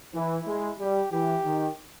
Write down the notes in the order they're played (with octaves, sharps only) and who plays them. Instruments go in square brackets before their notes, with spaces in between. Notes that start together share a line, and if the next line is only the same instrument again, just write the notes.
[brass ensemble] E3 [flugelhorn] E4
[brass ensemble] G#3
[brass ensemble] G3 [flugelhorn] G4
[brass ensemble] E3 [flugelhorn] G4
[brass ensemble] D#3